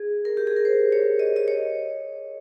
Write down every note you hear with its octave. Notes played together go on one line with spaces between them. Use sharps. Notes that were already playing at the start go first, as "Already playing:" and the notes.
Already playing: G#4
A#4
G4
G#4
A#4
C5
C#5
D#5
D#5
C#5